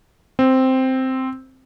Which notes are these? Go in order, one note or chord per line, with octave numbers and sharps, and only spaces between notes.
C4